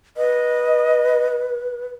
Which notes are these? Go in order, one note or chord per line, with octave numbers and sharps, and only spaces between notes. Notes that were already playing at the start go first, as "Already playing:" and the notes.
B4 D#5